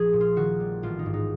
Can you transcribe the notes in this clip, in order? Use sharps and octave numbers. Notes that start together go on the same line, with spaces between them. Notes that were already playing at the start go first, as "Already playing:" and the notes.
Already playing: A#1 F3 G#4
A#2
F4
D#3 F#4
G3
A1 F4
D#4
G#2
D#4